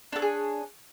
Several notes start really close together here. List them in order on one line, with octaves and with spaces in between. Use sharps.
D4 A4 C#5 G#4